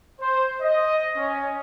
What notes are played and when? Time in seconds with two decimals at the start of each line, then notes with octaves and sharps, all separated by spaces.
0.20 C5
0.62 D#5
1.16 C#4